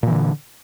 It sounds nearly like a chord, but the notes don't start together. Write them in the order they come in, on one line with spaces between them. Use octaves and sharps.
A#2 E3 D3